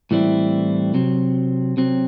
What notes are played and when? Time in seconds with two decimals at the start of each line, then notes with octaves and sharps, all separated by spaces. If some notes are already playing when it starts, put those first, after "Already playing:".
0.11 A2 E3 G3 C4 E4
0.94 C3 F#3 C4
1.77 C3 F#3 C4